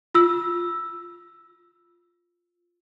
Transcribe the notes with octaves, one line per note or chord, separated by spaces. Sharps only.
F4 E6